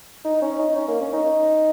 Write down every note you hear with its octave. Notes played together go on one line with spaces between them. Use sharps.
D#4
C#4
D#4
C#4
A#3
C#4
D#4